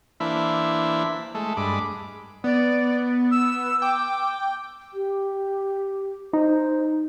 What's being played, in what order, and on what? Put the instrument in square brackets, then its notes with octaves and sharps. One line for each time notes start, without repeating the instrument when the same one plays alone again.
[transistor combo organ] E3 A#3 D4 E4 C5 E5
G#3 A3 A4
G2 G#3 B5 D6
[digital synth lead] B3 [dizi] D5
[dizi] E6
[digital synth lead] G5 [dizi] D6
[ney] G4
[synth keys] D#4 [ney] C5